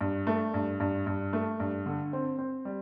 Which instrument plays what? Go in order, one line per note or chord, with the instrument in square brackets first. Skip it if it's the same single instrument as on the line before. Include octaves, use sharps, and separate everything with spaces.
[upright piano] G2
A3
G2
G2
G2
A3
G2
D3
C4
C4
G3